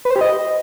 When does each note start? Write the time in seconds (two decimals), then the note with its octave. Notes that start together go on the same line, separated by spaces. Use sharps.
0.05 B4
0.10 C5
0.16 G4
0.21 D#5